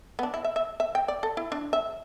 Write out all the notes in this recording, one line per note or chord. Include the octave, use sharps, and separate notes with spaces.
B3
D4
E4
E5
E5
E5
G5
D5
A4
E4
D4
E5